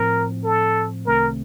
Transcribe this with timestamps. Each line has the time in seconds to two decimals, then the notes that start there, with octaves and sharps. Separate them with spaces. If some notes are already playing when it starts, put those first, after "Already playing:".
Already playing: A2 F3 C4 A#4
0.44 A4
1.07 C2 C3 D#3 A3 C4 A#4